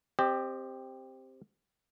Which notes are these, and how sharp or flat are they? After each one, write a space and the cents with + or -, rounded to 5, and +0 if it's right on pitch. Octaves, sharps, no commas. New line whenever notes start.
C4 +0 G4 +10 D#5 -35